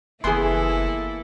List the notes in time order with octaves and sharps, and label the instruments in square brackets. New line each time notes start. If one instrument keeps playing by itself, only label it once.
[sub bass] F#1 [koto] E3 B3 [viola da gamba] A#3 E4 A4 [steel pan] G#4 C6